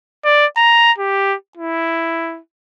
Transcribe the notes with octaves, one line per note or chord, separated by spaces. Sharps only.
D5
A#5
G4
E4